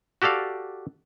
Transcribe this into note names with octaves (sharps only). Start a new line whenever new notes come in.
F#4 G4 A4 D5 F5